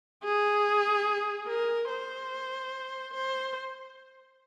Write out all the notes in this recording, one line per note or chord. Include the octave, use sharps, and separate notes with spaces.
G#4
A#4
C5
C5